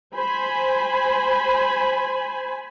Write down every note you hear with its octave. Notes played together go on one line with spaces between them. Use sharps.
C5 G#5 B5